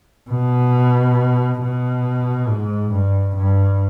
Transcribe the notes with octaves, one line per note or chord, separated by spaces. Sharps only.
B2
B2
G#2
G2
G2